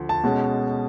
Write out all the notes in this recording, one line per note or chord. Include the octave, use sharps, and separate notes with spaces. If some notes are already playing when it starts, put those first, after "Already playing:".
Already playing: D2 F3
A5
B2 G#3 C#4